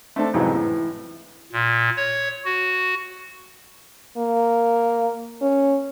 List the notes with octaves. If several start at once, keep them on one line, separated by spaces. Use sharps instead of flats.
A3 C4 D4 A4
C2 F2 G#2 E3 F#3 G#3
A2 E3
A#2
C#5
F#4
A#3
C#4